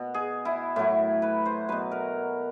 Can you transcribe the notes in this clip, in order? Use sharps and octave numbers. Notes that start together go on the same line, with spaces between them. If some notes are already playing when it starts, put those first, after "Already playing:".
Already playing: B2
G#4
E4
A2 F#3 E4
B4
C5
B2 F#3 B4
A#4